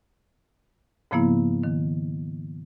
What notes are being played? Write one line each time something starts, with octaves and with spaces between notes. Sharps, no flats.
G#2 C#3 F3 A#3 B3 E4
D#3